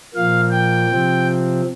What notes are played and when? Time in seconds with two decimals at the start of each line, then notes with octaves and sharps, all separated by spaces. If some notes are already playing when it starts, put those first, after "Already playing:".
0.14 A#2 F3 A#3 F5
0.51 G5
0.89 C3 F3 C4